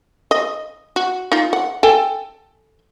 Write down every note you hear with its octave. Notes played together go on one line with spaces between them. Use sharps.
D#5
F#4
D#4 F4
F#5
A4 G5 G#5